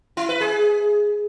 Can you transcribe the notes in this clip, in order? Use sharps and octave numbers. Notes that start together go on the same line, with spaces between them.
E4
B4
G#4